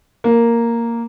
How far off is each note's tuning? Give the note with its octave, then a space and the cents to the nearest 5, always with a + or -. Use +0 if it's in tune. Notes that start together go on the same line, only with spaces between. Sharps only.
A#3 -5